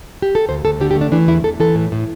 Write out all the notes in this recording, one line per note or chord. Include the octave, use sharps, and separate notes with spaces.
G4
A4
D2 C5
D2 A4
D3 G4
G4
A3
D4
E3 D4
E2 E4
E2 A4
E3 A4
A2
A2